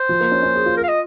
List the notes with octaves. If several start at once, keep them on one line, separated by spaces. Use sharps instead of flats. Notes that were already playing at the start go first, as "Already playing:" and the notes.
Already playing: C5
F3
A#3
C#4
C#4
G#4
F4
A#4
F5
D#5